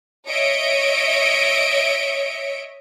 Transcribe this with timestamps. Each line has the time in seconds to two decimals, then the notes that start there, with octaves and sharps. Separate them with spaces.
0.28 C#5 D#5 E5 C#7 D7